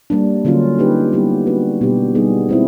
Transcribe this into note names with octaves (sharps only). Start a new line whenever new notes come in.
G3 A#3 D4
D3 F#3 A#3 C#4 F4
A#3 D#4 G4 B4
G3 B3 E4 G4
A#3 D4 F#4 B4
B2 G3 B3 D4 G4
G3 B3 D#4 G#4
G#3 C4 E4